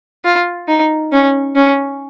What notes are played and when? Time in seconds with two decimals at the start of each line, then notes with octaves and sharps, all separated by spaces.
0.24 F4
0.68 D#4
1.12 C#4
1.55 C#4